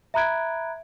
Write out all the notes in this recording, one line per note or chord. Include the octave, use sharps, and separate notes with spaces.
E5 A#5 B5 F#6 G#6 D7